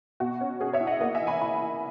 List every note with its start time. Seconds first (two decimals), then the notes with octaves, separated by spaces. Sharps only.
0.20 B2 F#4
0.41 C#4
0.60 C#4 G#4
0.73 C#5 E5
0.81 E4
0.87 D#5 F#5
1.01 A#3 D#5 F#5
1.15 E5 G#5
1.22 E3
1.27 G#5 B5
1.41 E4 G#5 B5
1.62 E4